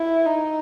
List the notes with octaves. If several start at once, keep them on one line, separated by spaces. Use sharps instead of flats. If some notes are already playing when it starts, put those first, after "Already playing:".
Already playing: E4
D#4